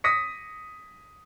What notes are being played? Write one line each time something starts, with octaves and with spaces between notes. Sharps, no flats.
D#6 A#6 B6 C#7